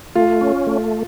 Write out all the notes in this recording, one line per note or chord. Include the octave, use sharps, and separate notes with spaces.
A3 F4
C#4
A3